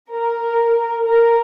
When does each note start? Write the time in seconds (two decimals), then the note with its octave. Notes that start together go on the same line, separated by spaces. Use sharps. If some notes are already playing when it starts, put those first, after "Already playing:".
0.12 A#4
1.06 A#4